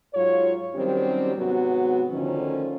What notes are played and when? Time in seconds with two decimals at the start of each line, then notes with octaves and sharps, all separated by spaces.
0.14 G#2 F#3 F4 C#5
0.75 D#3 F#3 G3 C4 C#4 G4
1.35 G#2 C3 F#3 B3 F#4
2.11 D2 D3 D#3 F3 C#4